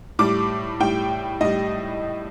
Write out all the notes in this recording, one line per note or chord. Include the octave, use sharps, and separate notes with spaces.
A2 G3 D6
A2 G3 G5
A2 G3 D#5